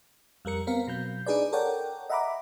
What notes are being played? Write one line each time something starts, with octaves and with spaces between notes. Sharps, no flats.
F2 G3 A#4 C#7
B3 C4 A#4 F5
B2 F#3 G6
D4 D#4 G#4 B4 D5
A4 A#4 C#5 D5 F#5 G5
D#5 E5 F#5 A#5 B5 D6